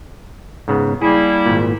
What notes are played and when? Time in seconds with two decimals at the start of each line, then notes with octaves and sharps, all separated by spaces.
0.68 G#2 C#3 B3
1.02 G3 A#3 E4 G#4
1.46 G#1 A#2